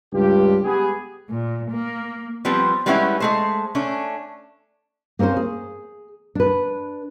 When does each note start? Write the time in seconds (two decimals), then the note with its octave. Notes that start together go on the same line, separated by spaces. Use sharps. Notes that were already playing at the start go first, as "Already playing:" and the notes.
0.13 C#2 G2 D4 F4 G4
0.64 G#3 B3 G4 G#4
1.29 A#2
1.71 A#3
2.45 F3 G3 B3 C4
2.86 G3 G#3 B3 C#4 D#4 E4
3.20 G#3 A3 C5
3.75 A3 C#4 D4
5.19 A#3 C4 C#4 A#4 C5
5.37 G#4
6.35 D4 B4